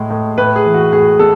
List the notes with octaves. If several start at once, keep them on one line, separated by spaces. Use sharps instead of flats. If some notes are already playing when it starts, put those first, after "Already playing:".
Already playing: A2 G#3
A2
A2 B4
G#4
E3
F#4
A2 G#4
G#3 A4